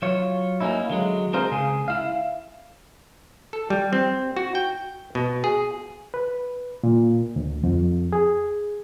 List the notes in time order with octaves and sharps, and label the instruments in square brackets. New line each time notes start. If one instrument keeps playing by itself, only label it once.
[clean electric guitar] F#3 F4 C#5
A#3 C4 C#4 D#4 E4
D3 F#3 G#3
C4 D4 G#4 A#4 C5 F5
C#2 C#3 G#4
E4 F5
[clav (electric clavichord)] A4
G3
C4
F#4
G5
B2
G#4
[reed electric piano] B4
A#2
D2
F2
G#4